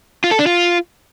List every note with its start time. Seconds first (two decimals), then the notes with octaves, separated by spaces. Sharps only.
0.24 F4
0.31 A4
0.39 D4
0.47 F4